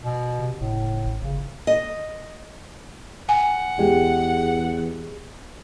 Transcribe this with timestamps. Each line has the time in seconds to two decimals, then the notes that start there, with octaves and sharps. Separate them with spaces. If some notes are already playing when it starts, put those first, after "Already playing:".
0.03 B2
0.39 C3
0.60 F#1 A2
1.05 A1
1.21 G1 C#3
1.67 D#5
3.29 F#5 G#5
3.79 E2 G#3 G4